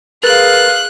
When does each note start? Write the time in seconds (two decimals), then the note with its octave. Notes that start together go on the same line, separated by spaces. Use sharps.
0.23 G#4 A#4 B4 F5 F#6 A6